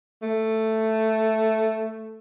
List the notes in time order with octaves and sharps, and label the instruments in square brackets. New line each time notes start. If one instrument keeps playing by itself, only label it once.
[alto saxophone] A3